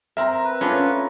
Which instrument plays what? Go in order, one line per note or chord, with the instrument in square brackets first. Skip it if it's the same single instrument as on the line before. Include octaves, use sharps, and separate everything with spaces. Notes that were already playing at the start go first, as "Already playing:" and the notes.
[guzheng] C4 A#4 [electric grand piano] E5 A#5
[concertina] B4
[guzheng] A3 B3 D4 [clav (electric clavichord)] C#4 [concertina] F4 B4